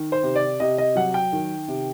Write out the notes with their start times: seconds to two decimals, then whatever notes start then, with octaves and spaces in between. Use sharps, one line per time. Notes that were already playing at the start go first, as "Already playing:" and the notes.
Already playing: D#3
0.12 C5
0.23 C3
0.36 D5
0.60 C3 D#5
0.78 D#5
0.96 F#3 F#5
1.14 G5
1.33 D#3
1.68 C3